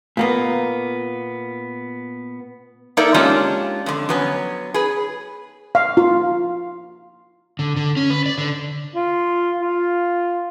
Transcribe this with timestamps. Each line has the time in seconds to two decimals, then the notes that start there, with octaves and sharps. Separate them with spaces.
0.17 A#2 A#3 B3
2.97 A#3 D#4 A4 A#4 D5 E5
3.14 G#3 A#3 C#4 D4 F4 G4
3.86 F2 D3
4.09 F#3 B3 C#4
4.74 G#4 B4
5.75 F5
5.97 F4
7.59 D3
7.76 D3
7.97 C#4
8.10 B4
8.26 D5
8.38 D3
8.95 F4
9.62 F4